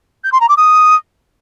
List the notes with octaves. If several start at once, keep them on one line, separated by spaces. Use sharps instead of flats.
G6
C6
A#5
D6
D#6